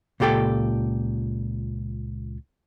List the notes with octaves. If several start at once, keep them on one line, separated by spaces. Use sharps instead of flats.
C#2 A#2 G4 A4 G5